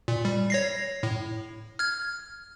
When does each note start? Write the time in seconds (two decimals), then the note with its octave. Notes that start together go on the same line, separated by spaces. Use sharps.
0.08 A#2
0.25 G3
0.50 C#5 A#6 C7
1.03 A2
1.79 F6 G#6